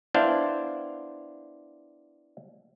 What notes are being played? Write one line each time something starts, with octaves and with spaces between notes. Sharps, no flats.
B3 D4 E4 C5 F5 G5